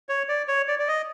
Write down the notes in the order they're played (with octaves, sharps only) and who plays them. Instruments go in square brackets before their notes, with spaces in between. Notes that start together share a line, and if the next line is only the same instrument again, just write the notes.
[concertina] C#5
D5
C#5
D5
D5
D#5